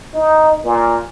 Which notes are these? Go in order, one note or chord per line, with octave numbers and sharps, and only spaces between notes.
D#4
A#2